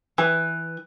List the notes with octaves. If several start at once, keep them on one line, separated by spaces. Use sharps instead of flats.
E3